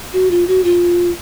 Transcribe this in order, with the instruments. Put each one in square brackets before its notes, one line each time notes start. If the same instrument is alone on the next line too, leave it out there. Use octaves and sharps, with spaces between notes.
[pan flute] F#4
F4
F#4
F4